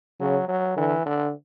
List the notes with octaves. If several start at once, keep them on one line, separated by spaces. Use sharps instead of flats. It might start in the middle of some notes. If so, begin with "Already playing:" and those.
C#3 F#3
F#3
D3 E3
D3